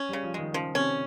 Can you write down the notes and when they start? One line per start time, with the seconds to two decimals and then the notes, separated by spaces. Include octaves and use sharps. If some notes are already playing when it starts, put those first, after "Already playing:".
Already playing: C#4
0.09 G3
0.13 C#3
0.24 F3
0.34 D#3 G#3
0.54 C#3 F3
0.75 C3 C#4